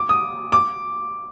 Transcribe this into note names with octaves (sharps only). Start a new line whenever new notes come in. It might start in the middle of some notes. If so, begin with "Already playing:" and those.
Already playing: D6
D#6
D6